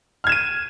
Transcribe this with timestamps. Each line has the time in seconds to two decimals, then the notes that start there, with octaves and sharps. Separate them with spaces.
0.24 F6
0.27 G#6
0.29 E7
0.32 D#7